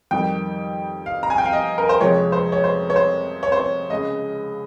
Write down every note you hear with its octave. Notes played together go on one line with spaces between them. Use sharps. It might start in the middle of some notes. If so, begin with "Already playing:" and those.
F2 D#3 G3 G5
F5
A#5
G#5
G5
F5
D#5
A#4
C5
F2 C3 F3 G#3 C#5
C5
C#5
C5
C#5
C5
C#5
C5
C#5
C#2 C#3 G#3 D#5